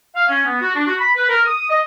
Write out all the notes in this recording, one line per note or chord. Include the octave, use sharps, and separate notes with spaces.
F5
C#4
B3
F#4
D4
F#4
B5
B4
A#4
D#6
D#5